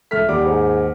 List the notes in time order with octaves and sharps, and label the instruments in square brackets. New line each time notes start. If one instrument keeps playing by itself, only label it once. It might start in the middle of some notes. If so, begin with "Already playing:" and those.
[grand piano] C#2 F6 B6 [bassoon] A3
[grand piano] D#2 F#5 D6 [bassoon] G3
[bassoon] G#2